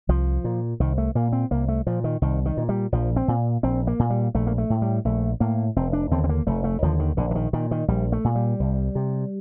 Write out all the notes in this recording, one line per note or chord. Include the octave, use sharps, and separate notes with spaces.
C2 F3
A#2
C2 D#3
A3
A#2 A#3
C4
C2 A#3
A3
A#2 F3
D#3
C2 D#3
D#3
A#2
G3
A#1 F3
C4
A#2
A#1 C4
A#3
A#2
G3
A#1 A3
A#3
A3
A2
G3
A#1 A3
A2 A#3
F1 C4
D4
D#2 D3 C4
C4
A#3
F1 A3
A3
D#2 D3 F3
D#3
A#1 D3
D3
D#3
A#2 D#3
D#3
A#1 G3
A3
A#2
G3
C2
C3